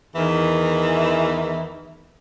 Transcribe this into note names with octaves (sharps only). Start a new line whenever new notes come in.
E2 D#3 E3